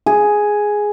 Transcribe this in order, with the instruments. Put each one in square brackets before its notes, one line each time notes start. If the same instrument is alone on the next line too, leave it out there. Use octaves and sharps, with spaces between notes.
[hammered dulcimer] G#4